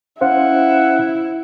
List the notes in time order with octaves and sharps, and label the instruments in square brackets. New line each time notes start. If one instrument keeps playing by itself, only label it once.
[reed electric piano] C#4 C5 F5 [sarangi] E4 [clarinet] F#5